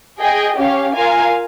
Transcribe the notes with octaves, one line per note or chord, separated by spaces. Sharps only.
G#4 D#5 G5
C#4 G4 C#5 F5
F4 A#4 F5 G#5